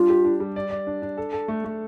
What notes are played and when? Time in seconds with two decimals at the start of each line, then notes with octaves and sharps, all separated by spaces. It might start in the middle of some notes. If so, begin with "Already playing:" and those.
Already playing: G3 D4 F4
0.10 G4
0.25 D4
0.40 G3
0.56 D5
0.71 D5
0.87 D4
1.02 D4
1.17 A4
1.33 A4
1.48 A3
1.64 A3